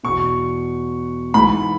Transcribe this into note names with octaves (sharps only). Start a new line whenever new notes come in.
E2 B2 C#6
G#2 E3 B5